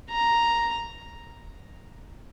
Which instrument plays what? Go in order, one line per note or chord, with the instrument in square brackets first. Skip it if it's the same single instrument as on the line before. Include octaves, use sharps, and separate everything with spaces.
[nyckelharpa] A#5